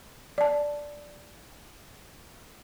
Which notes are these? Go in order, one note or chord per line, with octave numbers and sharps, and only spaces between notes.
D5 A5